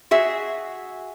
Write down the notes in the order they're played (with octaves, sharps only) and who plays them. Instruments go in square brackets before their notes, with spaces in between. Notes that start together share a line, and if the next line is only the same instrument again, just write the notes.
[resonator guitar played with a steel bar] F#4 G#4 E5